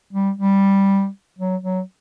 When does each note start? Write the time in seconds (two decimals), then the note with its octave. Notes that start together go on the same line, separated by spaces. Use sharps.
0.13 G3
0.37 G3
1.39 F#3
1.63 F#3